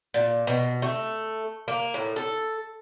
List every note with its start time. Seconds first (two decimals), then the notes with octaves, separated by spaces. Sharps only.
0.14 A#2
0.47 B2
0.82 A3
1.68 A#3
1.94 A2
2.16 A4